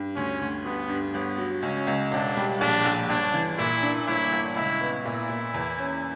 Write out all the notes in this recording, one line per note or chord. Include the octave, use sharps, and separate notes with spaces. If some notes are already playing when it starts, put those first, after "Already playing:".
Already playing: G2
D2 C#4
D2
G2 B3
G2
G1 B3
F#3
C#2 C#4
C#2
E1 D4
G3
A#1 D4
A#1
G1 D4
E3
A#2 E4
D4
G1 E4
G1
C#2 E4
B3
A#2 E4
A#2
E2
C#4